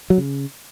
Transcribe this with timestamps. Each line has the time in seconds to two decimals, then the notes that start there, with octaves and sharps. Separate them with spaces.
0.10 F#3
0.18 C#3